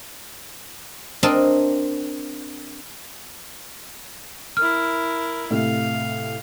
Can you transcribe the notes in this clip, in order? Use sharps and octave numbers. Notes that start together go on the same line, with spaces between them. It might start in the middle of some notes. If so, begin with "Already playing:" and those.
C4 D4 A#4 D#5 A5
E4 A#4 F6
A2 C3 A3 F5